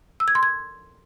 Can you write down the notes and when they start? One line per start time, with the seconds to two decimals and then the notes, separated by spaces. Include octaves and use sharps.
0.20 E6
0.28 G#6
0.35 C6
0.43 G#6